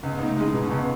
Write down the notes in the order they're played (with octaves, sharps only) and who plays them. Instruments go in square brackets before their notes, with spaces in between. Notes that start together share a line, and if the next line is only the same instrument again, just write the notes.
[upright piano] C#2 [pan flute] C#4
[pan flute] B3
[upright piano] D#4
[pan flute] A3
[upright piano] G#3 [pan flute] C#4
[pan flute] E4
[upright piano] B2 [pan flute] D#4
[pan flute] C#4
[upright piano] C#2 [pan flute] B3